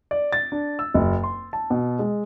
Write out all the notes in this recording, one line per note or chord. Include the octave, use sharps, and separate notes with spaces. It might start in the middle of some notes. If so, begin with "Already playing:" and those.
D5
A6
D4
E6
F#1
C6
A5
B2
G#3